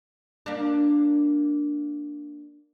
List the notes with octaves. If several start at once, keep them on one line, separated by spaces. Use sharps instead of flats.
A#3 D4